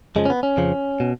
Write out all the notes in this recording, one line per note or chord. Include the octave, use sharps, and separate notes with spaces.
F2 C#3 F3 G#3
C#4
B3
C#4
F2 C#3 F3
B2